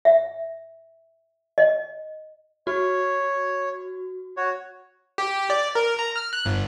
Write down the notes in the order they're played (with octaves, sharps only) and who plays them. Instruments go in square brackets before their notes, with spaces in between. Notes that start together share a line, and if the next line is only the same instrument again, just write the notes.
[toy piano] E5
D#5
[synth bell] F#4 [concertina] C#5
[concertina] F#4 C#5
[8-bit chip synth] G4
D5
A#4
A#5
F6
F#6
G1